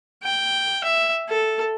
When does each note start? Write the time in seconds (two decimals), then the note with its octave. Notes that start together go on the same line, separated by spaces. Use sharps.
0.23 G5
0.84 E5
1.29 A4